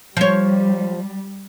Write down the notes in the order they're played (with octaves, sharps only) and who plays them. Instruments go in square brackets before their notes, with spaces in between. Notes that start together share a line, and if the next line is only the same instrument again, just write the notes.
[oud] F3 C#5 [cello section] G3